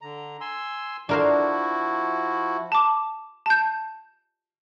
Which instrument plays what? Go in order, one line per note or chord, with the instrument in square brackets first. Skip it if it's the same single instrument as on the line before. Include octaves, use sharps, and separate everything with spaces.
[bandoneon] D3 A#5
G#5 C6 E6
[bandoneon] F3 E4 F#4 [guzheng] D4 A#4 C5
[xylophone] A5 D6
A5 G6